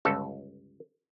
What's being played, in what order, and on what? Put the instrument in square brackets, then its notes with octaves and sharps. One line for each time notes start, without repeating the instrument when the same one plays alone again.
[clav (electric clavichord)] G1 C#2 A4